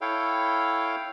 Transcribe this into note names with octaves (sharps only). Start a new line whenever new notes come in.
E4 A4 C#5 F5 G5